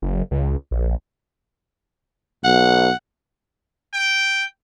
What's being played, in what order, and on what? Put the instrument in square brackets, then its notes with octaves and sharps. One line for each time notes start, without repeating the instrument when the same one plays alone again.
[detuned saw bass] F#1
C#2
A#1
[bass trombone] B1 [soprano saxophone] F#5
[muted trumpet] G5